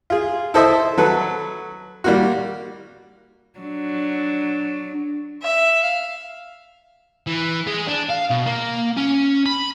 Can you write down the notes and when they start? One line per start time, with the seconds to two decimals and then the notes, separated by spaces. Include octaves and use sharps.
0.10 F4 G#4
0.54 E4 A4 C5 D#5 E5
0.98 F#3 A4 B4
2.04 G3 A#3 F#4
3.59 F#3 D4
5.42 E5
5.84 F5
7.27 E3
7.67 G#3
7.87 D4
8.09 F5
8.30 B2
8.46 A#3
8.97 C#4
9.46 B5